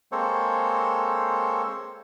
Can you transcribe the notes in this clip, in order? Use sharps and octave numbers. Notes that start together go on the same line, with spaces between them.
G#3 A#3 C4 A4 C5 C#5